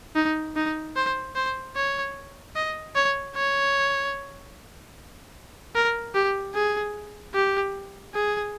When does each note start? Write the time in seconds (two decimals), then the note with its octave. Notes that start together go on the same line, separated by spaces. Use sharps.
0.16 D#4
0.56 D#4
0.96 C5
1.36 C5
1.76 C#5
2.56 D#5
2.95 C#5
3.36 C#5
5.75 A#4
6.15 G4
6.54 G#4
7.34 G4
8.14 G#4